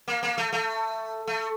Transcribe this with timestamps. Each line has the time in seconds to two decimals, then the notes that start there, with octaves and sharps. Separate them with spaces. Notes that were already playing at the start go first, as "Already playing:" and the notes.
0.08 A#3
0.23 A#3
0.38 A3
0.53 A3
1.27 A3